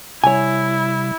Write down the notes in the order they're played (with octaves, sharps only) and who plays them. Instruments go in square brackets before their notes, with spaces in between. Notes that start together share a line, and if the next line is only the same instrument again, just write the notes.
[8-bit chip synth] C3 G3 [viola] E4 [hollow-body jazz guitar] C#5 G#5